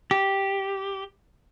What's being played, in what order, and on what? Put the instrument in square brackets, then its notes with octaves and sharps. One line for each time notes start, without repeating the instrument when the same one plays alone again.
[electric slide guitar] G4